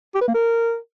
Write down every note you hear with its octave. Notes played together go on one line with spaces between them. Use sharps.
G4
B4
A#3
A#4